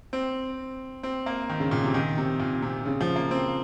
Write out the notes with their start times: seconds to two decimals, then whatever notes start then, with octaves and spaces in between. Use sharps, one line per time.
0.13 C4
1.03 C4
1.26 A#3
1.49 D#3
1.60 C#3
1.71 A#2
1.84 C3
1.94 D#3
2.18 C3
2.39 A#2
2.62 C3
2.86 C#3
3.01 F3
3.16 A#3
3.31 C4